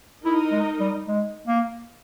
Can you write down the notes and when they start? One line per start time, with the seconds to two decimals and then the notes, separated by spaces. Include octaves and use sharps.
0.25 D#4 E4 A#4 D#5
0.52 G#3
0.80 G3
1.08 G#3
1.48 A#3